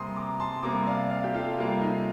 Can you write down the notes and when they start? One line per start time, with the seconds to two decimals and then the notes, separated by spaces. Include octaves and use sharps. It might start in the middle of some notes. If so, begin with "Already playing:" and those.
Already playing: C3 G3 A#3 A#5 C6 D#6
0.16 A#5 D6
0.40 A5 C6
0.63 C3 G3 A#3 A#5 D6
0.86 D5 F5
1.10 D5 F5
1.24 G4
1.34 F4 A4
1.57 C3 G3 A#3 F4
1.81 D#4